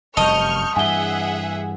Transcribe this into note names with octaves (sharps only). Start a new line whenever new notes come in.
F1 F#2 G3 D#5 A5 C#6 F6 G6
G2 E3 G#4 E5 F#5 G#5 G7